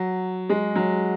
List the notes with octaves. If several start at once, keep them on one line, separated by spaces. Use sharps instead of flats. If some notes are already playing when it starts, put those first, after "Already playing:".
Already playing: F#3
G#3
F#3